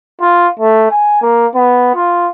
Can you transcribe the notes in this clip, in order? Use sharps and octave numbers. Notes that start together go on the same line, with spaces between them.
F4
A3
G#5
A#3
B3
F4